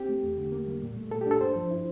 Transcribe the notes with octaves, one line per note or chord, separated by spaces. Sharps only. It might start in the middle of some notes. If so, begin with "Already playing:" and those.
Already playing: C4 G4
A3
E2
D3
A#3
G3
A#2
A3
A#2 A4
G4
D4 A4
G2 C5
F3
E4